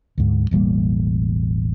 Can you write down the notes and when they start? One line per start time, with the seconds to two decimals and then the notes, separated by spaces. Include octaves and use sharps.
0.18 D2 G#2
0.51 E1 A1 G3 A#3